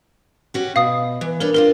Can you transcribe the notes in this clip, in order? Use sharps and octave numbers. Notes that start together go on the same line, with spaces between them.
C#4 F#4 G4
B2 F5 D#6 C7
E3 B4
D4 A#4 B4 C#5
C4 D4 F4 A#4